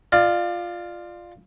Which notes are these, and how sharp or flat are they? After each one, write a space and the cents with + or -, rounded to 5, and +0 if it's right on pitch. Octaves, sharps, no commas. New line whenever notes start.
F4 +0 D5 +30